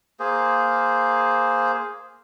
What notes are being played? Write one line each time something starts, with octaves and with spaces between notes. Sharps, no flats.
A#3 G#4 C5